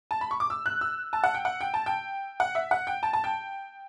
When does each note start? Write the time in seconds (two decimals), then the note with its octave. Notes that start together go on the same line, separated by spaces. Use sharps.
0.11 A5
0.21 B5
0.31 C#6
0.40 D6
0.50 E6
0.66 F#6
0.81 E6
1.13 A5
1.24 F#5
1.35 G5
1.45 F#5
1.61 G5
1.74 A5
1.86 G5
2.40 F#5
2.55 E5
2.71 F#5
2.87 G5
3.03 A5
3.13 A5
3.24 G5